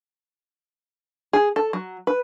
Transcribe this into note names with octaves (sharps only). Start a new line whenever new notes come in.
G#4
A4
F#3
B4